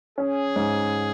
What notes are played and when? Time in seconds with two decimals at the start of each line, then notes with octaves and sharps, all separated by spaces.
0.18 C#4 G#4
0.56 G#2